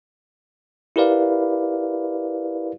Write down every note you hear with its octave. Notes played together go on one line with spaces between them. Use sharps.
E4 G4 A#4 B4 D5 F5